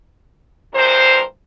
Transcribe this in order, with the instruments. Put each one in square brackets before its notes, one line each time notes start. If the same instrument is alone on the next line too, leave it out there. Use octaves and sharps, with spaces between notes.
[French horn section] E2 G2 A#4 C5